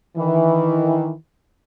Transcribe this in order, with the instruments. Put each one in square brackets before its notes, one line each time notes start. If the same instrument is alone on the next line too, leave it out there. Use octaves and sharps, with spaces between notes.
[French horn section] D#3 E3